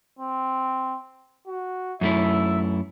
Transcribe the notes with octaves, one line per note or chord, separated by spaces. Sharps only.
C4
F#4
F#2 A3 E4 E5